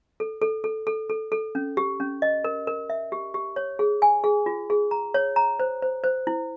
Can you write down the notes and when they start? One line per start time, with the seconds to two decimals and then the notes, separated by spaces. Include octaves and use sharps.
0.20 A4
0.42 A4
0.64 A4
0.87 A4
1.09 A4
1.32 A4
1.55 C#4
1.77 G4
2.00 C#4
2.22 D#5
2.44 A#4
2.67 A#4
2.90 E5
3.12 G4
3.34 G4
3.56 C#5
3.79 G#4
4.02 G#5
4.24 G#4
4.46 F4
4.70 G#4
4.91 A#5
5.14 C#5
5.36 A#5
5.60 C5
5.82 C5
6.04 C5
6.27 E4